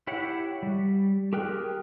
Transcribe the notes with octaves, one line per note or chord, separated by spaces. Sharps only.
E4 G4 C#5 F#5
G3
G4 G#4 A#4 G5 F#6